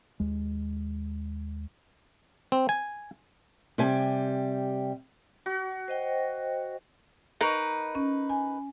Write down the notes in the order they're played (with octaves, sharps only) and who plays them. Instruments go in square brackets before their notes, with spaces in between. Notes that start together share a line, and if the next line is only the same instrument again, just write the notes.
[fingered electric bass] D#2 G#3
[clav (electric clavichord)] C4
G#5
[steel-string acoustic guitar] C3 G3 G4 G#5
[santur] F#4
[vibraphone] C5 D#5 G5
[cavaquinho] D#4 A#4 B4 [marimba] D#5 C#6
[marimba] C#4
G#5